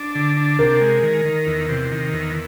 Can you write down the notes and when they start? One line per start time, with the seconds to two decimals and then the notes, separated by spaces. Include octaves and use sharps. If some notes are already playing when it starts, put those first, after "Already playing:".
Already playing: D4
0.15 D3
0.37 D4
0.59 C3 A#4
0.81 G#3
1.03 D#3
1.25 D#3
1.47 E2
1.69 C3
1.91 D#3
2.13 E2